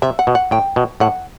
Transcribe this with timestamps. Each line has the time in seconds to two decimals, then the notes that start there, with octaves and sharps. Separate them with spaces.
0.02 C3 E5
0.19 F#5
0.27 B2
0.35 F#5
0.51 A2 G5
0.76 B2
1.00 A2 F#5